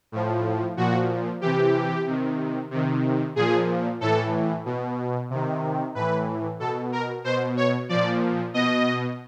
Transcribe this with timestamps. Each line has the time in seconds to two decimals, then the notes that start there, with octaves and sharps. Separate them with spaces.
0.12 A2 F3
0.77 A#2 F3 F#4
1.41 C3 E3 G4
2.07 C3 D#3
2.71 C3 D#3
3.36 A#2 F3 G#4
4.01 A2 E3 A4
4.65 B2
5.30 C3 D#3
5.95 A2 E3 B4
6.60 B2 A4
6.92 A#4
7.24 B2 C5
7.57 C#5
7.89 A#2 F3 D5
8.54 B2 D#5